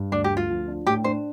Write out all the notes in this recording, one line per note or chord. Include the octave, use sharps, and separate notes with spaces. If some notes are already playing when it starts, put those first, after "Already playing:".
Already playing: G2
D2 D4
G4
D2
F4
F3
D4
A2 G4
D4 C5